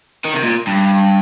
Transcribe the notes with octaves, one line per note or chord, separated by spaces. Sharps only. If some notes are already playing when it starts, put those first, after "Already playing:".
D#3
C3
A#2
G2